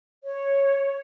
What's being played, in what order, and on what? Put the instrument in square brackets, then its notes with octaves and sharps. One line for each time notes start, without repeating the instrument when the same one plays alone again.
[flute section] C#5